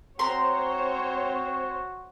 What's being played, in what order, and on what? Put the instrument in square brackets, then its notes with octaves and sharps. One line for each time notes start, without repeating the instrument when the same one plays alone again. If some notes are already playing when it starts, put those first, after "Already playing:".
[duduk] C4 [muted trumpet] F#4 [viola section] C5 C#5 [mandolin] A#5 C6